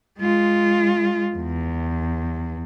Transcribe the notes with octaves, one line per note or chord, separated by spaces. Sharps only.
G#3 F4
E2